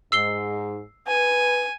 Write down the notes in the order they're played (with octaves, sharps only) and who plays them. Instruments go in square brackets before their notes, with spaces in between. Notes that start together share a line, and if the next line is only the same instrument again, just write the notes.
[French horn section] G#2 [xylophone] E6 C7 G7
[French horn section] B4 [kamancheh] G#5